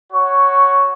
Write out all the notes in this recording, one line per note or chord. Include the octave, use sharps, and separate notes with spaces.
F#4 C#5